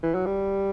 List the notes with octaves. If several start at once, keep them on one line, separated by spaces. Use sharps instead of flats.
E3
F#3
G3